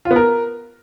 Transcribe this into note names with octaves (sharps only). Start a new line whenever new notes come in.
F4
B3
A#4